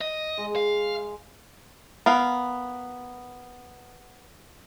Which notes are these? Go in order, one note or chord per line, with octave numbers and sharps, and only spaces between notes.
D#5
G#3
F5
B3 A#4 F5